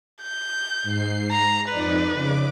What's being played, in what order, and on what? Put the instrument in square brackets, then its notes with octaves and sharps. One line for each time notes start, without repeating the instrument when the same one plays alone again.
[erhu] G6
[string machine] G#2 C7
[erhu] A#5
[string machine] F2 D#4 D5 [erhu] B4
[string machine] C#3 D6